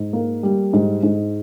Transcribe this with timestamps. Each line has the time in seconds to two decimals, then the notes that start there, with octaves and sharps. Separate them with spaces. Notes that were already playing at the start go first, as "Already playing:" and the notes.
Already playing: G#2
0.13 A#3
0.43 G3
0.73 G#2
1.03 G#2